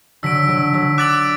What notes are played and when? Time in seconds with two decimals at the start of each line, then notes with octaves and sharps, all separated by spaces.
0.23 D3 F#3 E6 B6 D7
0.48 D3 F#3
0.73 D3 F#3
0.98 D6 F#6 A6 D7 F#7